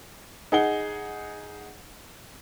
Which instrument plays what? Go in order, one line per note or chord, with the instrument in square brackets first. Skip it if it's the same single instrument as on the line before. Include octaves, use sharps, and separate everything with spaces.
[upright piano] D#4 G#4 F#5 G7